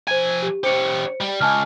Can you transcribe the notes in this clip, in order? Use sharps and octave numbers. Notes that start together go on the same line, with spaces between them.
F3 C5 G#5 G#6
G4
C#4 G4 C5 C#7
G3
C#2 G#5 A5 F6